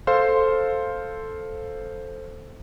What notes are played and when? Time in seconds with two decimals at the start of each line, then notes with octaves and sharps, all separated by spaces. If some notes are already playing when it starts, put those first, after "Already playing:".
0.07 A4 C5 F5 C6